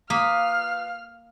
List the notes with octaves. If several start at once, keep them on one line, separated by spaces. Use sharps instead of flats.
A#3 F4 B4 F5 D#6 F6 B6